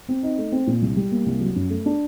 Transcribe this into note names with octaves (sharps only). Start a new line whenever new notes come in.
C4
D#4
A3
C4
A#2
C2
G3
A#3
C2
F#3
F#2
A3
D4